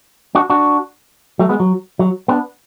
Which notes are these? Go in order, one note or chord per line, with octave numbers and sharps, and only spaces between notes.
D4 F#4
D4 F#4
F#3 A3
G#3 B3
F#3
F#3
B3 D4